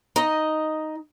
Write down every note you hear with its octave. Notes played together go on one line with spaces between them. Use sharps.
D#4 D#5